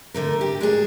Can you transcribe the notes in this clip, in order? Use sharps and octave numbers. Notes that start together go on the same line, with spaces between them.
D3 A3 A#4
G4
G#3 D4 G#4